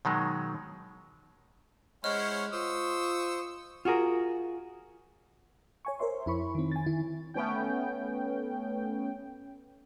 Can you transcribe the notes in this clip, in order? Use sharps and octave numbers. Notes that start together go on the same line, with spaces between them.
B2 D#3 F#3 G#3
G#3 C#4 E4 C5 C#5 D#5 F#5 F6
F4 C5 C#6 D#6 E6
F4 F#4 G#4 A#4
C#5 G#5 C#6
A#4 C5 C#5 E5 C6
F2 E4 B5 C#6
D#3 C4
G#5 A6
D#3 E4
A3 B3 C#4 G5